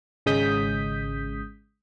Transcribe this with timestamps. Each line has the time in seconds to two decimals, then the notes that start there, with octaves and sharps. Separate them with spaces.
0.26 G#1 C#3 G#3 D#6 G6 B6